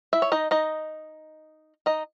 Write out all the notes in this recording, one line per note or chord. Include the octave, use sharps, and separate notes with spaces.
E4 E5
C#5
D#4 D#5
D#4 D#5
D#4 D#5